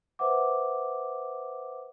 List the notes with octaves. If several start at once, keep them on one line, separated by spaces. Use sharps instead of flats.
B4 C5 E5 F#5 D6